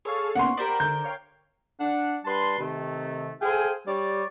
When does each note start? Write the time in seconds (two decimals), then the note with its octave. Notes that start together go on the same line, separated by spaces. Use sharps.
0.05 G#4 A4 C#5 F5
0.35 C#3 A#3 B3 F#5 C6
0.57 G4 A#4 C5 D5 G5 B5
0.80 D3 G6
1.04 C#5 F5 G5
1.81 D4 F#5
2.25 G3 D4 B4 A5 C6
2.59 C3 D#3 A3
3.41 G#4 A4 C5 F5 G5 G#5
3.87 G3 G4 C#5 D5